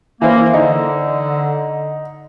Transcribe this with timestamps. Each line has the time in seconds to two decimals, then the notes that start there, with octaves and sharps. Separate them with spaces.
0.22 E3 A#3 C5
0.53 D3 D#4